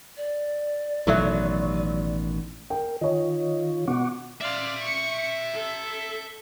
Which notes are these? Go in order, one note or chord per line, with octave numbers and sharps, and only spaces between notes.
D5
A1 B2 D#3 F#3 E4 A4 E5
A#4 G5
D#3 F4 C#5 D#5
B2 F#5 C#6 D6
D5 E5 F5 C6
C#6 C#7
A4